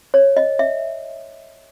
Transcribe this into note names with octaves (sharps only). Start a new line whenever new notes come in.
C#5
D#5
E5